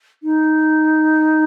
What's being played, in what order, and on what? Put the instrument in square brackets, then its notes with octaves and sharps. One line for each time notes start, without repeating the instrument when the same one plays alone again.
[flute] D#4